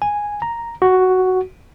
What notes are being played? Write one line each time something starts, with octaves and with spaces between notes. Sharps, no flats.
G#5
A#5
F#4